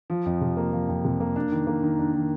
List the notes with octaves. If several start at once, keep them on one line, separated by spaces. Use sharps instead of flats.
F3
F2
C3
A#3
F3
F2
C3
A#3
D4
D#3
A#3
D#3
D4
D#3